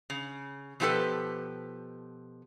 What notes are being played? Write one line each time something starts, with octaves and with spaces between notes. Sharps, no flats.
C#3
B2 F3 E4 G4 A4 B4